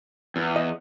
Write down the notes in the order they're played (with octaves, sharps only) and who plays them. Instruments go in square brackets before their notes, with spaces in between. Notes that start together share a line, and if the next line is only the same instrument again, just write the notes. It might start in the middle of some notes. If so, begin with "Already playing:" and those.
[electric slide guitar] E2
[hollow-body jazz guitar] D#5